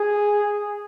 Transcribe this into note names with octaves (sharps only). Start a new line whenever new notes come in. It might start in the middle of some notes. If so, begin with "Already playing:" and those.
Already playing: G#4